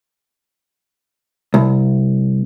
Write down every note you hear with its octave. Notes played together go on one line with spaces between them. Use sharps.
C2